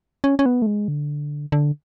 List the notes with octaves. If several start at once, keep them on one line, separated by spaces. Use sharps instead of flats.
C#4
C#4
B3
A3
G#3
D3
D3